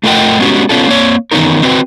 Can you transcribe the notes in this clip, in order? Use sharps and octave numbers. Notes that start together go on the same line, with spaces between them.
A3 F4 A#4 D#5 F#5 G5
G#3 B3 C#4 F#4 G4
B3 C#4 F4 A4
A#3 C4 C#5
D#3 E3 B3 C#4 D#4 A#4
C4 F#4 B4 G5